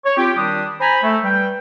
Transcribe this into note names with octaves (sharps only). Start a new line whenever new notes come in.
C#5
C4 F4 G4
D#3 G3 D4 G4 D#6
C5 G#5 A#5 B5
A3
G3 B4 G5